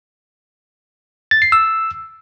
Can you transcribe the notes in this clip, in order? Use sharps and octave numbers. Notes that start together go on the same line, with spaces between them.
A6
C7
E6